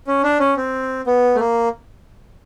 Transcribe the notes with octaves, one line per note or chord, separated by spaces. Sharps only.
C#4
D4
C#4
C4
B3
A3
A#3